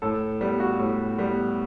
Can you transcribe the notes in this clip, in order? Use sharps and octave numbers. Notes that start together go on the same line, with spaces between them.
A2 A4
G3 B3
F#4
A2
G3 B3